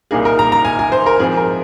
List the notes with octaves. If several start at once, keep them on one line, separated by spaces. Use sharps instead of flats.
C2 A#2 A#3 D#4 G#4
A#4
A#5
A#5
G#5
G#5
C5
A#4
G#2 F3 C4 G#4
A#4